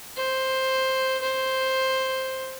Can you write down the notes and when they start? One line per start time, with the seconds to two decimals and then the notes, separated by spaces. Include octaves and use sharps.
0.17 C5
1.22 C5